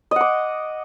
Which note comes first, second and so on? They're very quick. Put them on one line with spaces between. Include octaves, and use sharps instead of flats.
D#5 F#5 D6